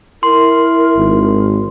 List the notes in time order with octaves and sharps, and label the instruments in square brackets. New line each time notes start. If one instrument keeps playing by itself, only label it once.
[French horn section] E4 [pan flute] A#4 [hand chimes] C6
[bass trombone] G#1